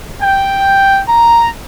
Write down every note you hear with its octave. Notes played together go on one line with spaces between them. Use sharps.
G5
A#5